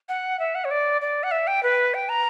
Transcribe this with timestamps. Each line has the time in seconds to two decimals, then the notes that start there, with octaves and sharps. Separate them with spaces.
0.09 F#5
0.40 E5
0.55 F#5
0.65 C#5
0.71 D5
1.02 D5
1.23 F#5
1.31 E5
1.47 G5
1.63 B4
1.94 G5
2.09 A#5